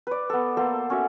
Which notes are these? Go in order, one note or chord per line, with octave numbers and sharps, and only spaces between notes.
B4 D5
B3 A4
A#3 B3 A4 C5
C#4 F#4 E5